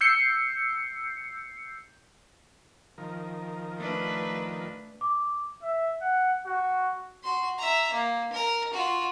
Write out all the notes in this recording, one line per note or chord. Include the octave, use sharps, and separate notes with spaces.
E6 G6 C7 C#7
D#3 F3 A#4
A3 D4 B4
D6
E5
F#5
F#4
F#4 C6
E5 A#5
A#3
A#4
F4 F#4